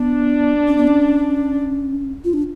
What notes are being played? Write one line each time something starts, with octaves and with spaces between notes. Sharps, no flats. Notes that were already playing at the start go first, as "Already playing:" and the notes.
Already playing: B3 D4
C#4
B3
C#4
F4
D4